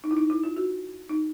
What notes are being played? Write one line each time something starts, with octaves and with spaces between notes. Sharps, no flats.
D#4
E4
D#4
E4
F4
F#4
D#4